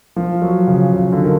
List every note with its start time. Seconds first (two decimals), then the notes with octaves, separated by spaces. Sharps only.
0.16 F3
0.42 F#3
0.67 C#3
0.93 C#3
1.12 D3
1.24 D#3